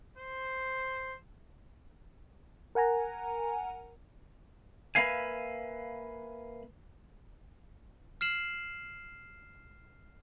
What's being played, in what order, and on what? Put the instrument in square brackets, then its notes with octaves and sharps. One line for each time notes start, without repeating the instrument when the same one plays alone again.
[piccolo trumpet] C5
[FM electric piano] A#4 F#5 G#5 A#5
[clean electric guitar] A#3 B4 E5 F5 G#5
[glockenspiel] F6 C7 E7 F#7